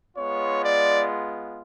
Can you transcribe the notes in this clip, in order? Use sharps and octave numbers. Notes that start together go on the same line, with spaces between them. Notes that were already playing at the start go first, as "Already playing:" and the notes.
G#3 B3 F4 C#5
D5